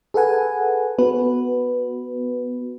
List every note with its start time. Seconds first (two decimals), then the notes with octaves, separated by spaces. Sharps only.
0.14 G#4 A4 B4 F#5 G#5
0.98 B3 F#4 B4